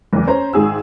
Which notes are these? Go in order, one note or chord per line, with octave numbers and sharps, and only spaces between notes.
F#1 E2
C#4 C5 A#5
G#1 G#2 G#4 E6